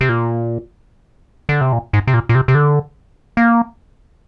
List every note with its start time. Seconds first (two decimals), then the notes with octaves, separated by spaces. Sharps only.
0.01 C3
0.09 A#2
1.49 D3
1.61 C3
1.73 A#2
1.93 G#2
2.07 C3
2.14 A#2
2.29 A#2
2.35 C3
2.48 C3
2.55 D3
3.37 A#3